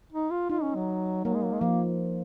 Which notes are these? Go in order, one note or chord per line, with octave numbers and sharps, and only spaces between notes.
D#4
F4
D#4 F4
C#4
F#3
F#3 A#3
G#3
F#3
G#3
F3 A#3